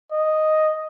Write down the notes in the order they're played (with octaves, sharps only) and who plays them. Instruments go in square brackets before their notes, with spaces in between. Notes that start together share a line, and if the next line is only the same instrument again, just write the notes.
[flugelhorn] D#5